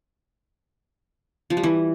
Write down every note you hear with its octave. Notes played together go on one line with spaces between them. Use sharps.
F3
G3
E3